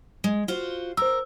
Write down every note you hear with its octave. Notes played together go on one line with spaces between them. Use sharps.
G#3
F4 F#4 C5
A#4 C5 E6